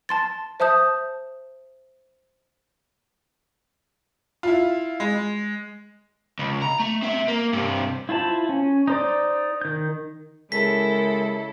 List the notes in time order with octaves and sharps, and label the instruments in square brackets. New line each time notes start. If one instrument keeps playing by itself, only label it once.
[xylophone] A5 C6 A6
C5 E5 A5 D#6 G6
[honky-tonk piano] E4 F4
G#3
[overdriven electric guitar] C#2
A#5
A3
C4 E5
A#3
G2 C3
[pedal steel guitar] E4 F4 C5 A5 B5
C#4
D#4 C5 D5
D#3 G6
[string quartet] C#3 E4 A4 [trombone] G#3 [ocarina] A#4 [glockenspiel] B6